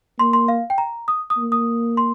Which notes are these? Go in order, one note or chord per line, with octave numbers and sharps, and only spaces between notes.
A#3 C6
C6
F5
G5
A#5
D#6
D#6
A#3
D#6
C6